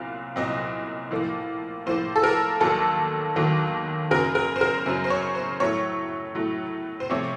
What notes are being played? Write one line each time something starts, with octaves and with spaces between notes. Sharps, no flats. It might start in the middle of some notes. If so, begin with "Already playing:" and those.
Already playing: C2 A#2 F#3 C4 F5
C2 A#2 F#3 C4 D#5
A2 F3 A#3
A2 F3 A#3 C5
A4
A#4
D#2 D#3 F#3 A#3 A4
D#2 D#3 F#3 A#3
F#2 C#3 F#3 A#4
A#4
C5
A#4
F#2 C#3 F#3 C5
C5
C#5
C5
A2 F#3 A3 C#5
A2 F#3 A3
C5
C3 F3 A3 C4 C#5